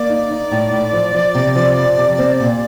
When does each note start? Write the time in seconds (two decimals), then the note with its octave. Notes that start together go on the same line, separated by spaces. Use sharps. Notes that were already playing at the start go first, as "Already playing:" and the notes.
Already playing: A#3 D5
0.10 D#4
0.31 D#4
0.51 A2
0.72 A2
0.93 F3
1.15 F3
1.35 C3
1.56 F3
1.76 F2
1.98 C3
2.19 C4
2.40 A#2